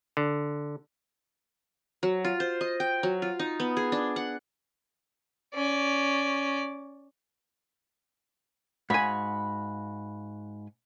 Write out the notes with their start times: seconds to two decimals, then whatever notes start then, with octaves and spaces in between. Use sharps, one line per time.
0.17 D3
2.03 F#3
2.25 F4
2.40 C5
2.61 D#5
2.80 G5
3.03 F#3
3.22 F4
3.39 D#4
3.60 B3
3.77 G#4
3.92 D4
4.16 F#5
5.55 C#4 D5
8.90 G#2 F#4 F5 G#5 B5